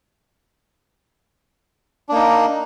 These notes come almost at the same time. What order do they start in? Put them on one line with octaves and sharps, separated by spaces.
D4 A#3 D#4